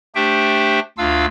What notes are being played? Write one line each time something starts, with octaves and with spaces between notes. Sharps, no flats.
A3 D4 G4 C5 E5 G5
D2 D4 F4 F5 E6